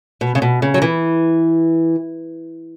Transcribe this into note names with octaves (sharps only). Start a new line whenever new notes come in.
B2
C#3
B2
C#3
F#3
E3